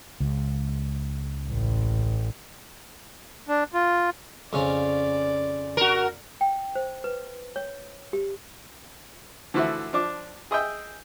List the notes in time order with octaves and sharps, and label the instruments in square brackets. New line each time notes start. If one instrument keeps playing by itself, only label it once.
[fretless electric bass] C#2
[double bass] A1
[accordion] D4
F4
[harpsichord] F2 C#3 C#4 [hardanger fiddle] D5
[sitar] F#4 A#4
[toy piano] G5
C5
B4
C#5
G4
[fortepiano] D3 E3 F3 A3 E4 F#4
F3 D4 D6
G#4 D#5 E5 G5